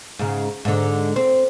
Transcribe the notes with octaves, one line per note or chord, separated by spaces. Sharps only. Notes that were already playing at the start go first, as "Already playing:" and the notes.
G#2 C#3
G#2 D3
C4